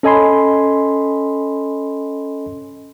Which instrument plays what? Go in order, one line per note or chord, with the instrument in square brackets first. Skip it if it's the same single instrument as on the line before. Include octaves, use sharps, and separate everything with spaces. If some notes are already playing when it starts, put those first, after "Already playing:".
[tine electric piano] C#4 A4 D#5 G#5 B5 C6